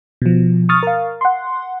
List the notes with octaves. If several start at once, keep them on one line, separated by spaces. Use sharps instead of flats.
B2 F3
C#6 D#6 F6 A6
A#4 F5
F#5 C6